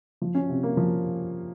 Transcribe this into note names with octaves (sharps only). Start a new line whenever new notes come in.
F3
C#4
C3
A#3
F3